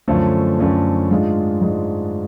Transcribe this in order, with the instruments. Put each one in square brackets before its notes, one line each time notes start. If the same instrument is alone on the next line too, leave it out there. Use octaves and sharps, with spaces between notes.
[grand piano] F#2 D3 F3 A3 C#4
F#2 D3 F3 A3 C#4
G#2 G#3 D4 F4
G#2 G#3 D4 F4